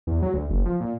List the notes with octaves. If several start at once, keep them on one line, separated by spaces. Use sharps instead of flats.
E2
F#3
D2
F#1
F3
A#2